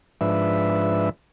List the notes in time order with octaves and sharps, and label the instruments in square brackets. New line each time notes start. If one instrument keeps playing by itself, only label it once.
[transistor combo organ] G#2 F3 D4 B4 E5